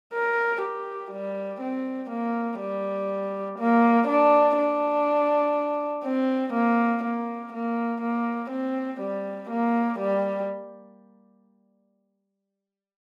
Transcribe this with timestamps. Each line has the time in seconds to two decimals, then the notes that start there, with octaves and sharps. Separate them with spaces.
0.13 A#4
0.62 G4
1.12 G3
1.61 C4
2.10 A#3
2.60 G3
3.58 A#3
4.08 D4
4.57 D4
6.05 C4
6.53 A#3
7.04 A#3
7.53 A#3
8.01 A#3
8.51 C4
9.01 G3
9.50 A#3
9.99 G3